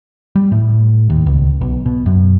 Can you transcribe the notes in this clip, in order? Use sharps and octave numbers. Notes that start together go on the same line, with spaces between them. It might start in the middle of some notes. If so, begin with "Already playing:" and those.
G3
A2
D#2
C#2
B1
B2
F#2